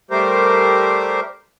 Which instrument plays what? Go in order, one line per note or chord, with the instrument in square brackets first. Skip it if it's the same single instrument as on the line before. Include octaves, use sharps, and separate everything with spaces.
[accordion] G3 A3 G4 A#4 C5